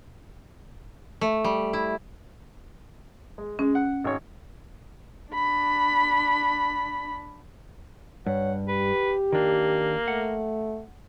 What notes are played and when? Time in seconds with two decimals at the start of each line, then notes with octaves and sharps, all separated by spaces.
1.21 A3
1.44 G3
1.73 E4
3.38 G#3
3.59 G#3 C#4
3.75 F#5
4.04 G#1 C#5
5.33 D4 B5
8.27 G2 C#5 F#5
8.68 G4 B4
9.33 D#3 A#3 D4
10.08 A3 F#5